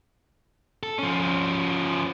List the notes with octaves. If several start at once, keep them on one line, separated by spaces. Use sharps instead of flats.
A4
F3 C#4